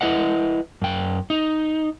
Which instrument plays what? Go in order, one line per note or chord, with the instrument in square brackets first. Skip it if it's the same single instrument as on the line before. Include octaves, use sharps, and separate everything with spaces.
[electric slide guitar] E4 B4 D#5 F#5
F#2 G5
D#4